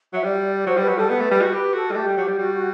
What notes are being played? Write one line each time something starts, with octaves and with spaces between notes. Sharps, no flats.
F#3 E5
G3 D5
F#3 C5
G3 B4
F#3
G3 A4
B3 B4
A3
G3
F#4
G4 B4
F#4 A4
G3
A3 G4
G3
F#3
G3
G3 F#4
F#4